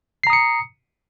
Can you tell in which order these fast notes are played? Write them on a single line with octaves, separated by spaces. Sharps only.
C7 A#5 D#6 C#7